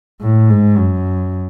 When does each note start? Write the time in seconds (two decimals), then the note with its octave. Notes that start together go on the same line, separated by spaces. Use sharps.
0.21 A2
0.49 G#2
0.78 F#2